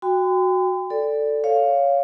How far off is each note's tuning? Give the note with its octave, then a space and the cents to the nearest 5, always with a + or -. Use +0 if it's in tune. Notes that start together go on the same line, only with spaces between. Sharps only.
F#4 +0 G5 +30 C6 -45
A4 +10 D5 +0
C#5 +10 F5 +0